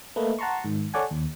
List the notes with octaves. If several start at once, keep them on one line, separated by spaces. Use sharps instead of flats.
A3 A#3 B4 D#5
F#5 A5 A#5 C6 C#6
G#2 D#3
A4 C#5 D5 F#5 G#5
D#2